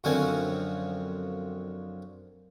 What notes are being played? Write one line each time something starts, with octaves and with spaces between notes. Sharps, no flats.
F#2 D3 F3 C4 C#4 G#5